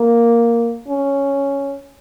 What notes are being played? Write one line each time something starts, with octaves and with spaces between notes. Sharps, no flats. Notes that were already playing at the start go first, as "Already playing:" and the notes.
Already playing: A#3
C#4